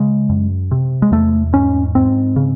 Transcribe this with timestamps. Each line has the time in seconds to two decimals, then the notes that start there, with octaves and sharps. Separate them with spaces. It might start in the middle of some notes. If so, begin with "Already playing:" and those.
Already playing: C#3 G#3
0.29 F#2
0.71 C3
1.02 G#3
1.12 E2 A3
1.53 G#2 C#4
1.95 G#2 C4
2.36 C#3